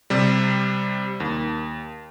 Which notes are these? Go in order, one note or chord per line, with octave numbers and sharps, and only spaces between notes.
C3 G3
D#2